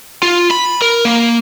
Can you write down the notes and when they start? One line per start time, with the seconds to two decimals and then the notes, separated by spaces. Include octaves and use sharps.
0.23 F4
0.51 B5
0.82 A#4
1.05 A#3